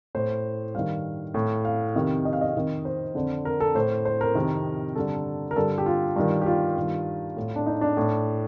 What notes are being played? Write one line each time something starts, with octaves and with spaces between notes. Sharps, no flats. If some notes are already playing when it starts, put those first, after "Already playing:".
A2 C5
G2 D#3 F5
A2
F5
F2 C3 D#3
D#5
F5
D#5
F2 D#3
C5
F2 D3
A#4
A4
A2 C5
C5
A#4
F2 C3 D#3
G2 D3 A4
A#4
G2 D3 A4
G4
F4
G2 D#3
G4
F4
G2 D#3
A2
D4
D#4
D4
A2